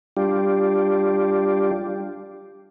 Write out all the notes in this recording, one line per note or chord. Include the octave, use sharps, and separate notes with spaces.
G3 D4 F4 G4